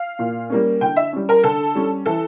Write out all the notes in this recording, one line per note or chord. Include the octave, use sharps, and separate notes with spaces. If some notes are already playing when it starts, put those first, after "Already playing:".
Already playing: F5
A#2
G3 A#3 C#4
D3 G5
E5
G3 C#4
A#4
D3 A4
G3 C#4
E3 A4